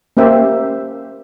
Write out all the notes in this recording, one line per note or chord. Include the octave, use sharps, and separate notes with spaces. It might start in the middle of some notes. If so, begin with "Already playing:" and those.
A#3 C#4 G4 C5 E5